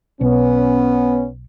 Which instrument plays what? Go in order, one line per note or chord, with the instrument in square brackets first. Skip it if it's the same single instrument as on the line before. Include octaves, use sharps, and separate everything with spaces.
[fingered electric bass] B1 [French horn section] B3 C#4